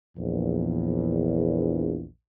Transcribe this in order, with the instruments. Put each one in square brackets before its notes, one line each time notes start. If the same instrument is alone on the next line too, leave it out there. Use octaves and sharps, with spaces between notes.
[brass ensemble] A#1 E2